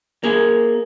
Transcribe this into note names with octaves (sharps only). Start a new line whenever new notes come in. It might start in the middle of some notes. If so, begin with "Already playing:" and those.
A#3 G#4